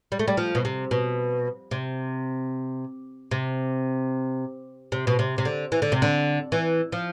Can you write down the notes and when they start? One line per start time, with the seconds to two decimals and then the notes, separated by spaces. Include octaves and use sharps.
0.12 G3
0.19 A3
0.28 G3
0.37 F3
0.55 B2
0.65 C3
0.91 B2
1.71 C3
3.31 C3
4.92 C3
5.07 B2
5.19 C3
5.38 C3
5.45 D3
5.72 E3
5.82 D3
5.92 C3
6.02 D3
6.52 E3
6.92 F3